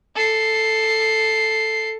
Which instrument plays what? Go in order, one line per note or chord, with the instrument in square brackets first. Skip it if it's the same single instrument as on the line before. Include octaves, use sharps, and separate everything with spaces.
[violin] A4 C7